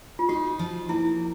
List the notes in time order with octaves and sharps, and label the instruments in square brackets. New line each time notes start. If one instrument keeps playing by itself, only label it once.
[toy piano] F4
[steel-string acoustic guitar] D#4 [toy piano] F#4
[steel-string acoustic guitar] F3
[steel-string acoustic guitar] A#3 [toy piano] E4